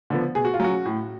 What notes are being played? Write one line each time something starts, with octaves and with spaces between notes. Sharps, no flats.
D3 F3 B3
B2 G#4
F#4
F4
F#3 C#4 F#4
A2